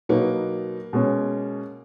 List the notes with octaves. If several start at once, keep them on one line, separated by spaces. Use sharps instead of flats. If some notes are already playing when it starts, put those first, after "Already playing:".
B2 F#3 A#3 B3 D#4
B2 G#3 C#4